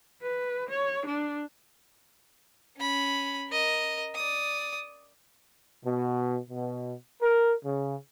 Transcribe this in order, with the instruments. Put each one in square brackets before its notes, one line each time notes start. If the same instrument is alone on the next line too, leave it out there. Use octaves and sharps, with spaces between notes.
[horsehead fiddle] B4
C#5
D4
[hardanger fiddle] C#4 B5
A#4 D#5
D5 D#6
[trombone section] B2
B2
A#4
C#3